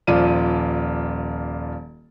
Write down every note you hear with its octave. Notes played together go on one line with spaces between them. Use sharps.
D#1 F3 F4 D5 D#7